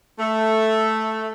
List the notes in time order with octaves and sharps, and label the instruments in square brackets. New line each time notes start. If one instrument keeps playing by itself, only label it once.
[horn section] A3